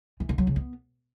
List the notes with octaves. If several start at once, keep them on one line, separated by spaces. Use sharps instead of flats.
E3
D3
F#3
C#3
B3